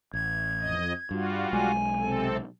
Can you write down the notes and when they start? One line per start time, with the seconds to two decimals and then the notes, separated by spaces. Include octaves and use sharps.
0.13 A1 G#6
0.60 F2 D#5
1.11 G2 G3 F4 F#4
1.53 B1 G#3 G#5
2.00 C3 C4 A4